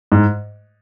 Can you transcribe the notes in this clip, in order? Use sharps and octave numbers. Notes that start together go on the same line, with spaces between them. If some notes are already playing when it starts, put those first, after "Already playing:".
G#2